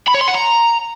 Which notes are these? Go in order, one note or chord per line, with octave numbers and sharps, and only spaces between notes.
B5
C#5
C6
F#5
A#5